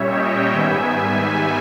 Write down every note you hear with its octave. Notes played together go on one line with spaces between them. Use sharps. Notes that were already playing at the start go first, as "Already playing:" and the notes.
Already playing: A#2 G3 C#4 C#5 E5
D#5 G5
G#2 D#3 G3 B3 E5 G#5